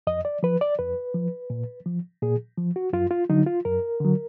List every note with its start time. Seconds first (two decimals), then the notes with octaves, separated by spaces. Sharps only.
0.07 F2 D#5
0.25 D5
0.43 F3 B4
0.61 D5
0.79 F2 B4
1.14 F3
1.50 A#2
1.86 F3
2.22 A#2 G#4
2.57 F3
2.76 F#4
2.93 F#2 F4
3.11 F4
3.30 D3 F#3 D#4
3.47 F4
3.65 F#2 A#4
4.00 D3 F#3